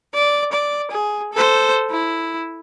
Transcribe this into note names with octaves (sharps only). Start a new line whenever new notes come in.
D5
D5
G#4
A4 C5
E4